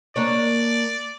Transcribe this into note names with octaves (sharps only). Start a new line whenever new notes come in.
A#3 D4 C#5 D5